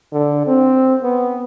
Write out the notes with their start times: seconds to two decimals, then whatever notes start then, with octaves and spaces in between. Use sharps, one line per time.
0.13 D3
0.47 C4
1.04 B3